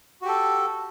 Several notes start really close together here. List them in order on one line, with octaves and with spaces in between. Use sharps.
F#4 G4 A4